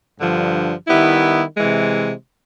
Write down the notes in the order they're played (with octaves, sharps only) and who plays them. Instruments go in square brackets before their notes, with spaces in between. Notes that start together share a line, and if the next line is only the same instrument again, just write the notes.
[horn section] G2 D3 F3
D#3 G3 B3 E4
C3 E3 G#3